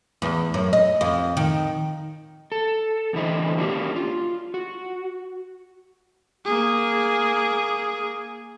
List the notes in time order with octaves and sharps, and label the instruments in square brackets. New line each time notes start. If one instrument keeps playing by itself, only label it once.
[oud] E2
F#2
D#5
F2
D#3
[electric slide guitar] A4
E2 D3 E3 E4 C5 D#5
G#3 A#3 C#4 D4 F#4 G4
F4
F#4
[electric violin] A#3 G#4